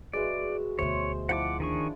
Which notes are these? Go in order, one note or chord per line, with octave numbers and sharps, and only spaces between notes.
G#3 F#4 B4 D5 E5
D2 B2 C5 C#5 E5
F3 E4 D5 F#5 G5 D6
D#3 D4 G#4 C#6